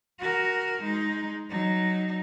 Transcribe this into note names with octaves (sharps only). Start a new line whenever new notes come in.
F#4 A#4
G#3 D#4
F#3 D#4